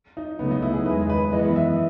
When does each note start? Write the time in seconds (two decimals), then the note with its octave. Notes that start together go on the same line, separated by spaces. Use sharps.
0.17 D#4
0.39 C#2 C#3 F#3 A3 B3
0.51 D#4
0.62 E4
0.74 G#4
0.86 E2 D#3 G#3 B4
1.10 B4
1.32 F#2 E3 G#3 B3 D#5
1.56 E5